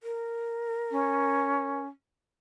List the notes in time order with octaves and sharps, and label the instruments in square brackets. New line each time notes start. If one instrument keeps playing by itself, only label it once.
[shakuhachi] A#4
[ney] C#4